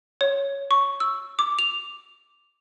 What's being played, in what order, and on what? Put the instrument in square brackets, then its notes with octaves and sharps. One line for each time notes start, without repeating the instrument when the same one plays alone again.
[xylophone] C#5
C#6
E6
D6
F7